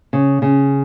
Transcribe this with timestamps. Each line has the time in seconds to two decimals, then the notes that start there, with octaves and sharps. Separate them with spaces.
0.13 C#3
0.42 C#3